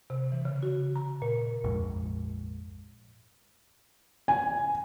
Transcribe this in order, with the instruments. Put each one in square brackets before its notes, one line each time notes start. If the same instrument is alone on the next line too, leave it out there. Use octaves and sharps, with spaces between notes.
[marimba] C3
E3
C#3
F#4
A#5
A#2
[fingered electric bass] A#1 F2 G#2
[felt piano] G#5